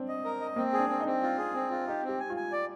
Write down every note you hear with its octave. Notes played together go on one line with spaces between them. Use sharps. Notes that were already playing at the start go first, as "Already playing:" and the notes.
Already playing: C4 D4
D#5
A#4
D#5
A#3 C4
G#4
D4
C4
D#4
C4
F4
G#4
C4
F4
D#4 G4
C4
G4
G#5
F4
G#5
D5